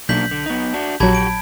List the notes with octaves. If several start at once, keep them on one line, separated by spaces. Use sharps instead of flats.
B1 A#3 D4 G6 B6 F#7
D3
B3 D#4
D4 F#4
A#1 F#3 F#4 G4 A5 B5 G#6
D7